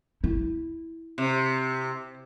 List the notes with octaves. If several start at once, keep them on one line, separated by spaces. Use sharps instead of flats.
E4
C3